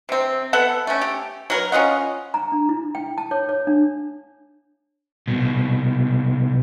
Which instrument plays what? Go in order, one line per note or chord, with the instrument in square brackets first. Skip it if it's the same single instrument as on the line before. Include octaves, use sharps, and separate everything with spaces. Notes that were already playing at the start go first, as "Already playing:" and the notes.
[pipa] C3 C4
B3 A4 F#5
A3 C#4
G4
F#3 A#4 B4
C#4 F4 D#5 F#5
[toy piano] A#5
D4
E4
G5
A5
C#5
C#5
D4
[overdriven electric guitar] C2 B2